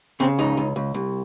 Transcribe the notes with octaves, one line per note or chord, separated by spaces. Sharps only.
C#3 C4
C#2 D#4
C#2
C#2
C2